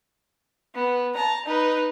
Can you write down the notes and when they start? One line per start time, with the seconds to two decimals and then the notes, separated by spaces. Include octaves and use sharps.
0.75 B3
1.15 A5 A#5
1.46 D#4 B4